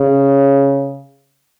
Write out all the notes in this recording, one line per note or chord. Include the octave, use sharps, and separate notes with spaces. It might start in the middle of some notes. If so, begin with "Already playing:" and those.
Already playing: C#3